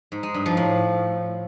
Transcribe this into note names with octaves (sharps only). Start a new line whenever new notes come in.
G#2
G#3
G2
F3
A2